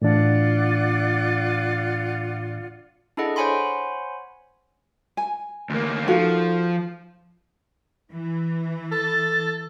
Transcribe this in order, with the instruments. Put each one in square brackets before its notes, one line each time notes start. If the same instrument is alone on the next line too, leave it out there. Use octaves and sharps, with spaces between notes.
[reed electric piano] A2 E3 D4 [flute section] F4 D5 F#5
[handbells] D4 E4 G#4 A4 D#5 F#5
C5 C#5 F#5 G#5 B5 C6
[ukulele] G#5
[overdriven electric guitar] D2 A#3
[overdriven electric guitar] F3 [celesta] D#4 A4 F5 [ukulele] F#4 A#4
[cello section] E3
[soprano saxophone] A4 [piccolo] A6